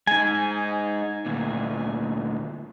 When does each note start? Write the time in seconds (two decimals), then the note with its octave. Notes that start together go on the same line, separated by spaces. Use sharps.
0.07 G#3 D#4 G#5
1.26 D2 A#2